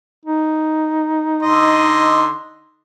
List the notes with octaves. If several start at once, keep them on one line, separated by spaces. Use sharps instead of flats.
D#4
D3 D#5 C6